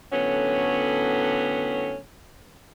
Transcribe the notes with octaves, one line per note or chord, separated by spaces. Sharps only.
A2 D3 F#3 B3 C#4